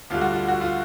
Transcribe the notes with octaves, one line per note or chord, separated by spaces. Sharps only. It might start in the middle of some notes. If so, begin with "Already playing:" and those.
D2 D3 G3 F4
F#4
F4
F#4
F4